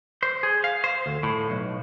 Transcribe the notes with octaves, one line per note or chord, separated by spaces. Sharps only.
C5
G#4
F5
C5
D2
A2
B1